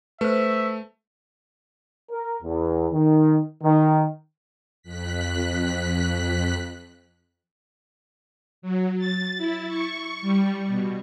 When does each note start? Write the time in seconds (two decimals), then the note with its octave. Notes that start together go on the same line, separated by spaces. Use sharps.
0.21 A3 B4 C5 E5
2.11 A#4
2.43 E2
2.92 D#3
3.63 D#3
4.82 F2 F#6 B6
8.62 F#3
8.98 A6
9.38 E4
9.68 C#6
10.21 G3
10.67 B2